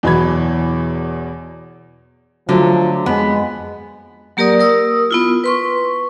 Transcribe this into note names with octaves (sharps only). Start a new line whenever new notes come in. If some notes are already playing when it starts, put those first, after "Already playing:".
E2 B2 E3 F#3 B5 G#6
D3 F3 F#3 A3
F2 G#3 B3
F#3 A#3 G4 A#4 D5 D#6
A#4 D#6 E6
B3 E4 F4
B4 C6 C#6